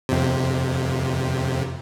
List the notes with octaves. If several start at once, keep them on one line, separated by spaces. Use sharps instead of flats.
F2 C3